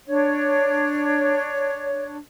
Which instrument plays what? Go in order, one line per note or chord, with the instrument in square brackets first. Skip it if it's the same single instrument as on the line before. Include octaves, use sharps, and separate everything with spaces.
[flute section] D4 C#5